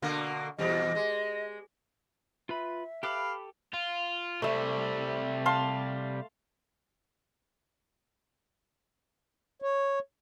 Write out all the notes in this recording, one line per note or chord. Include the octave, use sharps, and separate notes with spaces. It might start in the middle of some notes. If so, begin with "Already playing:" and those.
B2 D3 A#3
E2 B2 G3 D#5
G#3
F4 B4 E5 B5
G4 A4 B4 F5 B5 D6 F#6
F4
C3 G3 A3 E5
F5 A5 C6
C#5